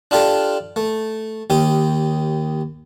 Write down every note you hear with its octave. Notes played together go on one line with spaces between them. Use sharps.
D4 F4 G4 A4
A3
D#2 G4 D#6